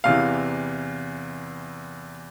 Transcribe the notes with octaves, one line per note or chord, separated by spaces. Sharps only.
E2 C3 E3 F5